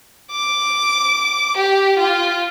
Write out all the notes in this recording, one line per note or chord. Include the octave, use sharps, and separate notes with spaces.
D6
G4
F4